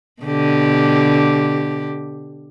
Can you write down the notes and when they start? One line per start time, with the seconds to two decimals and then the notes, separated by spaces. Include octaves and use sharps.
0.23 B2 D3 G4